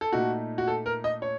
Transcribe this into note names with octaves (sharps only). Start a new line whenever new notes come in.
A4
A#2 A3 D#4 F#4
F#4
A4
A#4
D#5
C#5